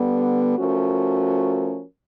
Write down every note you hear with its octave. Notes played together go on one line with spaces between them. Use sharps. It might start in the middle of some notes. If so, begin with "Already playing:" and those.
Already playing: D3 G3 B3
F3 A3 C#4 F#4 A#4